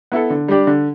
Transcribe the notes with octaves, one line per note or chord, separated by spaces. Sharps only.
B3 E4 A4
D3
G3 D4 G4 D5
D3